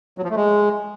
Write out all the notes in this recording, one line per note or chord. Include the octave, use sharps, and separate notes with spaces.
F#3
F3
A3
G#3